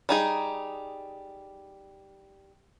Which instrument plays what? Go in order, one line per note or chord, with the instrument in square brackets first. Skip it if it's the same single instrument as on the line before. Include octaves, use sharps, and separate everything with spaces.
[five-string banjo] G3 D#4 G#4